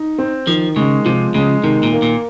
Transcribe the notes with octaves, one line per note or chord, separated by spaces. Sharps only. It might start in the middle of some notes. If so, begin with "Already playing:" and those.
Already playing: D#4
C4
D#3 F3
C#3 G#3
C3 F3
C#3 G#3
C3 D#3
A#2
A#3
A#2